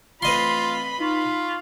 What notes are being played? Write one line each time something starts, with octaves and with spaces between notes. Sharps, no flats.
E3 A3 C4 F4 B4 D#5 B5 C6
D#4 F4 C#6